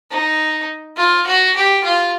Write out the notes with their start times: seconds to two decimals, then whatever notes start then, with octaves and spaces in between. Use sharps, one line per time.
0.11 D#4
0.97 F4
1.27 F#4
1.56 G4
1.84 F4